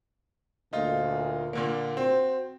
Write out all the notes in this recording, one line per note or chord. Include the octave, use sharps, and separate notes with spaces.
D2 A#2 D#4 F4
A#2 D3 A#3
C4 F#4 C5